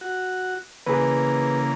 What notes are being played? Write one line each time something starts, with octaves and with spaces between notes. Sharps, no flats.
F#4
C#3 E3 A#3 G#4 B4